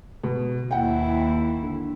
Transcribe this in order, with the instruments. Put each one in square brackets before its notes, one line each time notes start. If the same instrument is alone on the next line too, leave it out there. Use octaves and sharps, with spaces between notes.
[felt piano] B2
[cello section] D#2 E4 [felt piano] F#5 G5
[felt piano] D3